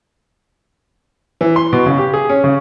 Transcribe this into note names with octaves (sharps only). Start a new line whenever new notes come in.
E3
C6
B2
C#3
G4
G#4
C#4
C#3